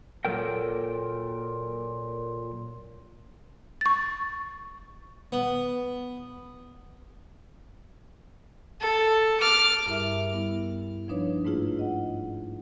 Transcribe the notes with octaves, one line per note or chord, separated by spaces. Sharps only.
A#2 F#3 A4 A#4 G5
C#6 A6
B3
A4
D6 F6
G2 G3 E4 G#4 A#4 E5
G3 B3 E4
F3 G3 D4 D#4 B4 C#5
G#2 A3 A#3 E4 F4 G#4
F4 D#5 F#5